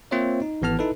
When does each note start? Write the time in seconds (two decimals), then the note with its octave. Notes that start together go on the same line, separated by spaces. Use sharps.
0.11 A#3 C4 F4 C5 C#5 E5
0.42 D#4
0.62 G#1 E3 B3 A5 F6
0.79 D#4 E4 A4 B4